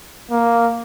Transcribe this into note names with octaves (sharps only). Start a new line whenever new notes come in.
A#3